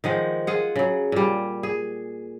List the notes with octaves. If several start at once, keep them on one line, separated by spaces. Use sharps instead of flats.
D#3 F3 G#3 F#5
F4 G#4 F#5
C#3 F#3
A#2 G3
G#4